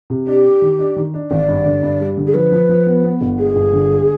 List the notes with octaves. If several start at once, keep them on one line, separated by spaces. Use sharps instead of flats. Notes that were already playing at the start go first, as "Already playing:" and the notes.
C3
D4 G4
D4
D#3
D4
D#3
D4
G#1 D5
G2
D3
G2
G3
D3
G#4
F3 B4
F3
F3
B3
B3
G1
G#3 G#4
G1
D3
G#3